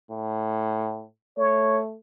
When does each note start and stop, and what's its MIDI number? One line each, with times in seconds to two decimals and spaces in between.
0.11 1.06 45
1.38 1.96 57
1.38 1.80 73